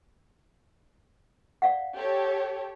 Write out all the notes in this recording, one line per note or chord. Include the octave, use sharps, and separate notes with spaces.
D5 F5 F#5
G4 A4 C#5